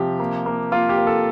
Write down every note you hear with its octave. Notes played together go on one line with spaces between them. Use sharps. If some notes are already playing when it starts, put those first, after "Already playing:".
Already playing: C3 F3 G4
A#3
A#3
A#3 F4
G4
A#3
A4